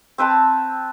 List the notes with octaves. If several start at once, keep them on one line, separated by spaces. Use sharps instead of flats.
C4 B4 G5 A5